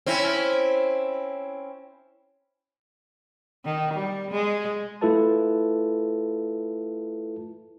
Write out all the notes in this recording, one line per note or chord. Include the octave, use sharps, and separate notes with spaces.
C4 C#4 E4
D#3
G3
G#3
A3 E4 F4 A4 B4 A5